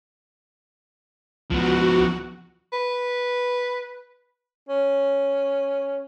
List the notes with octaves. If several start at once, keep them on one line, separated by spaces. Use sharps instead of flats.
C#2 F3 B3 F#4
B4
C#4